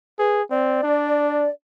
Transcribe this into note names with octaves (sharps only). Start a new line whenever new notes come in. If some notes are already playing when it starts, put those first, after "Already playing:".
G#4 B4
C4 D5
D4